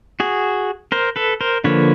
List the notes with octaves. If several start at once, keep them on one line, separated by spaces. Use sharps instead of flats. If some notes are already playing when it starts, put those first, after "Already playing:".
F#4 G#4
A#4 C5
A4 B4
A#4 C5
D3 F3 A#3 B4 C#5